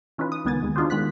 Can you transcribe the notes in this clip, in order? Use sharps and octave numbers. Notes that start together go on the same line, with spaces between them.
E3 C#4 D#4 F4 B4
D#6
C#2 D#3 B3 G#5 A6
D#2 G#3
D4 D#4 F4 F#4 G#4 C5
D#3 G#3 B3 F#6 B6